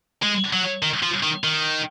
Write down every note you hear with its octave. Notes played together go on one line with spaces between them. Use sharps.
G#3
F#3
D#3
F3
D#3
D#3